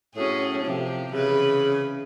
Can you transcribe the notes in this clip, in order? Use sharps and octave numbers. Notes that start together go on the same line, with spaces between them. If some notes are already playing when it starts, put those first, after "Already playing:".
A2 C#4 F#4 G#4
C3 F3 G4
C#3 E3 B4